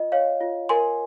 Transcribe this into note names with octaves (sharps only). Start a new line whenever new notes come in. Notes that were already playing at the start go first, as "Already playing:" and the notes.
Already playing: F4 D#5
C#5 F5
F4
A#4 G#5 C6